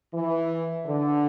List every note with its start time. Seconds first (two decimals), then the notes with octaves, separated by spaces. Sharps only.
0.13 E3
0.85 D3